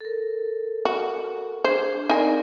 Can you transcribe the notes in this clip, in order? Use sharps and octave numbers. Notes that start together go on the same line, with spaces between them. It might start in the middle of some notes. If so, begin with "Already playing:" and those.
A4 A#4
F#4
D4 G#4 C5
C4 D#4 A#4 D5 G#5